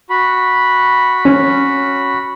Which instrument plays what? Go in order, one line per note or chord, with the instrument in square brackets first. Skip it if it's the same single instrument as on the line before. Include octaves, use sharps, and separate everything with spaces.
[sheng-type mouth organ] F#4 B5
[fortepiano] C#4